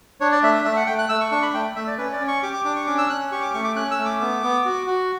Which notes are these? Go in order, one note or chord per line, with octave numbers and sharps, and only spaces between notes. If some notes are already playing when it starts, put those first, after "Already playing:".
D4 C#5
D5
A3 E5
E5
A3 E5
F#5
A3 G5
F#6
A3 E6
C#6
D4 C#6
B5
A3 G5
A3 E5
D5
C#4 B4
D5
C#4
C#6
G4 D6
D6
D4 D6
C#6
C#4 D6
E6
C#4 F#6
G4 C#6
D6
A3 C#6
D6
C#4 F#6
E6
A3
D6
B3
B3
F#4
F#4